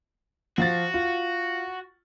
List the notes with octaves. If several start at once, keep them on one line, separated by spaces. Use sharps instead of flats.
F3 F#4 F5 A6
F4